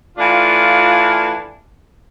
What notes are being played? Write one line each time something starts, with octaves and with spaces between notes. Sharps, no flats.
E3 A3 D4 F4